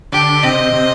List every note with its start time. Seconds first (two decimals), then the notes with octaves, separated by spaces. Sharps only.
0.13 D3 G4
0.43 C3 D#5
0.73 C3